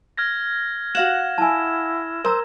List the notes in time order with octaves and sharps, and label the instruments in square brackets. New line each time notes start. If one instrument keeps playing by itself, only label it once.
[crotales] F6 G#6 A#6
[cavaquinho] F#4 F5 F#5 [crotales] E7
[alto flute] E4 [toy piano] G#5 A5
[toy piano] A#4 A#5 E6 [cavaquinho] C5